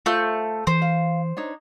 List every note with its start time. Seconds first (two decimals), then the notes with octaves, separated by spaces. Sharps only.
0.06 A3 F4 C5 E5 C#6 G6
0.67 E3 C5
0.82 F5
1.37 D4 D#4 C#5